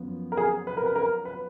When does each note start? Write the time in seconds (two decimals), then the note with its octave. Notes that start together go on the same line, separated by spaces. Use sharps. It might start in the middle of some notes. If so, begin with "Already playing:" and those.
Already playing: F#2 F3 B3
0.32 A#4
0.37 G#4
0.67 B4
0.77 A#4
0.86 B4
0.96 A#4
1.25 B4